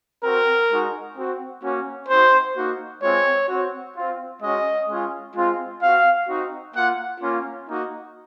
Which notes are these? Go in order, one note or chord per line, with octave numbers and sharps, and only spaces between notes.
C4 F#4 A#4
G#3 D#4 F#4
C4 F#4
A#3 C#4 F#4
C4 D#4 F#4 C5
A#3 D#4 F#4
G#3 C4 F4 C#5
C4 F#4
C4 F4
G#3 C#4 F#4 D#5
G#3 C#4 F4
G#3 C4 F4
C4 F#4 F5
C4 D#4 F#4
A#3 F4 F#5
A#3 C#4 F4
A#3 D#4 F#4